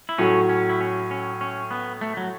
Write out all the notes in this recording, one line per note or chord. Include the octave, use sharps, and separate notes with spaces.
E4
A2 F#3 A3 C#4
C#4
E4
C#4
C#4
C#4
B3
A3
F#3